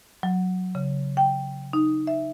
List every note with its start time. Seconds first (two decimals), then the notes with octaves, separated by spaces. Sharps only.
0.23 F#3
0.75 C#3
1.17 G5
1.73 D#4
2.07 E5